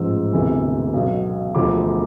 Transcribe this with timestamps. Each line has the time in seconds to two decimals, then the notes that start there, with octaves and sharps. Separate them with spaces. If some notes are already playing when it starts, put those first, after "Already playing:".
Already playing: A1 G#2 F3 E6
0.33 E1 D2 C3 E3
0.93 B1 B2
1.55 E1 D2 D3 F3 D6